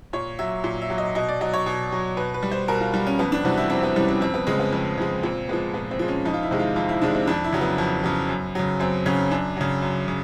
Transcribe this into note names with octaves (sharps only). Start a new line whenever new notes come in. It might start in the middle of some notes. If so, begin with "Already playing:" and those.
A#2 C#5
F#3 E5
A#2
E5
F#3
D#5
B2 D#5
D5
F#3 D#5
C#5
B2
F#3
B2 B4
B4
G3
C5
B2 A#4
F4
G3 F4
C#4
F2 B3
D4
C3 E3 G3 F#4
E4
F2 C4
B3
C3 E3 G3 C#4
C4
F2 C4
B3
C#3 F3 G#3 C4
B3
F2 C4
C#3 F3 G#3
A#2 C4
F3 G#3 B3
A#2 B3
C4
F3 G#3
C#4
F2 D#4
F4
E4
C3 D#3 G#3
F4
F2 F4
E4
C3 D#3 G#3 D4
C4
F2 D4
E4
C#3 F#3
B3
F2
C#3 F#3
F#2
C#3 F#3
F#2 C4
C#3 F#3 C#4
F#2 D4
C#3 F#3
F#2
C#3